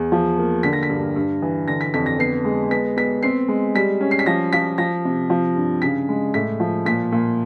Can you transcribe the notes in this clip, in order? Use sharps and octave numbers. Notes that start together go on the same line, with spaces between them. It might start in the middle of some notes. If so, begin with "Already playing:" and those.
Already playing: E2
F3
A#3
D3 B6
A#6
B6
G2
G2
E3
D3 A#6
B6
F2 B6
A#6
B3 C7
G#3
B3 B6
B3 B6
C4 C7
G#3
G3 B6
C#4
C7
B6
F3 A#6
F3 B6
F3 A#6
C3
F3
G2
C#3 B6
G#3
A2 B6
F3
A#2 B6
A#2